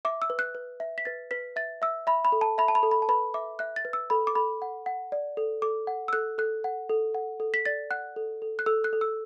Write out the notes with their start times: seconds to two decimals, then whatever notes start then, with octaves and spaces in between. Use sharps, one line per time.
0.05 E5 D6
0.22 E6
0.30 B4
0.39 F#6
0.55 B4
0.80 E5
0.98 B6
1.05 B4 A6
1.31 B4 B6
1.56 E5 A6
1.82 E5 E6
2.07 E5 B5
2.25 B5
2.32 A4
2.41 A5
2.58 E5 B5
2.68 A5
2.75 B5
2.83 A4
2.91 B5
3.02 A5
3.09 B4 B5
3.34 E5 D6
3.59 E5 F#6
3.76 A6
3.85 B4
3.93 E6
4.10 A4 B5
4.27 D6
4.35 A4 B5
4.62 F#5
4.86 F#5
5.12 D5
5.37 A4
5.62 A4 D6
5.87 F#5
6.08 E6
6.13 A4 F#6
6.38 A4 F#6
6.64 F#5
6.89 A4
7.15 F#5
7.40 A4
7.54 B6
7.65 D5 A6
7.90 F#5 F#6
8.16 A4
8.42 A4
8.59 F#6
8.66 A4 E6
8.84 F#6
8.93 A4
9.01 E6